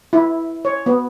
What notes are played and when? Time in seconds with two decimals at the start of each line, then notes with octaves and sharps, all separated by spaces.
0.13 E4
0.65 C#5
0.86 B3